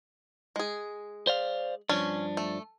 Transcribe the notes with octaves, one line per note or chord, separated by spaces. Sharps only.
G#3 G#4
C5 D5 F5
G2 F3 C#4 D4
A3